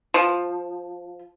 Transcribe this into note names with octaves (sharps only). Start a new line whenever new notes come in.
F3